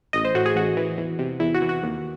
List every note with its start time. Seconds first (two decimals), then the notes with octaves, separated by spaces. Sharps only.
0.13 A1 D#5
0.25 C5
0.35 A2 F#4
0.46 G#4
0.55 A1 F#4
0.77 E3
0.98 E2
1.19 C3
1.40 E2 E4
1.55 F#4
1.62 E3
1.69 F#4
1.83 D#2